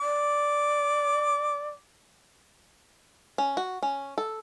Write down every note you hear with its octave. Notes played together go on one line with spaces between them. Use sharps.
D5 D6
C#4
F#4
C#4
A4